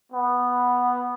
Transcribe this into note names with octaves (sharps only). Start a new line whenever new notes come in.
B3